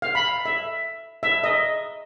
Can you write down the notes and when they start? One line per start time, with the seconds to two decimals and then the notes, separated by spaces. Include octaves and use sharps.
0.02 F5
0.15 B5
0.46 E5
1.23 E5
1.44 D#5